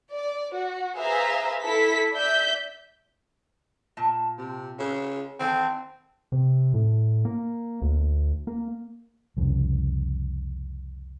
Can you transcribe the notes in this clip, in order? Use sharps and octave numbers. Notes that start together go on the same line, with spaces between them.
D5
F#4
G#4 B4 C5 E5 F5 A#5
E4 A4 B6
D5 E5 G6 B6
A#2 A5
C3
C#3
D#3 E3 C4 A4
C3
A2
A#3
D2
A#3
C2 F2 C#3